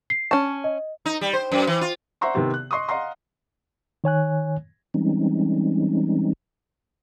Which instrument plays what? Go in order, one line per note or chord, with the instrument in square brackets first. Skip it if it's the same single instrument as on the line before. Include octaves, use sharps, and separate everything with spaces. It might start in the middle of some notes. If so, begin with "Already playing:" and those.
[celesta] C7
[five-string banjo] C#4 A5 [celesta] C#6
[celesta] D#5
[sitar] D#4
G3
C5
F#2
E3
F4
[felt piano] C5 E5 F#5 A#5 C6 C#6
C3 D#3 B3 C4 G4
F#6
D#5 C6 C#6 D#6
D#5 F5 F#5 A#5 C6
[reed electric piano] D#3 C#5 G#5 F#6
[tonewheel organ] E3 G3 G#3 C4 C#4 D#4